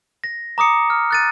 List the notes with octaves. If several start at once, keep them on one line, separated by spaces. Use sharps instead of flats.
A#6
A#5 D6 D#6 C#7
F6
F#6 A6 D#7